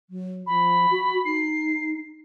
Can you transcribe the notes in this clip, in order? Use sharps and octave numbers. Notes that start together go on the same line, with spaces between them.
F#3
F3 B5
F#4
D#4 C7